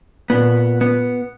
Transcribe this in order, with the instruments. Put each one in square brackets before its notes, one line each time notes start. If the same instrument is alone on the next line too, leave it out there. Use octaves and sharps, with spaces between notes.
[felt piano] A#2 [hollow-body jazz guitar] B3
[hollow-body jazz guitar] B3